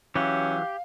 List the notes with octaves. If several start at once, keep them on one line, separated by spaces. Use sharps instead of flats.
E3 F#3 C#4 G4 F5